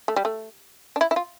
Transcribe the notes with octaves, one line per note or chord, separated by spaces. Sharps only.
A3
G3
A3
D4
E4
E4
F4